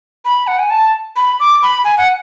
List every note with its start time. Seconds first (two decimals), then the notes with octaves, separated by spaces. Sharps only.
0.25 B5
0.47 F#5
0.59 G#5
0.70 A5
1.16 B5
1.40 D6
1.62 B5
1.84 G#5
1.98 F#5